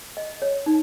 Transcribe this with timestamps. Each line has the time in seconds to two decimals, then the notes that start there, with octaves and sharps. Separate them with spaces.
0.17 D#5
0.42 C#5
0.66 D#4